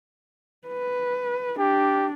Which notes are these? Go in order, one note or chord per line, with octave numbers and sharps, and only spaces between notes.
B4
D4 G4